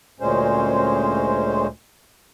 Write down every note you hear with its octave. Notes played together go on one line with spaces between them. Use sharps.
D2 A#2 G#3 C#4 C5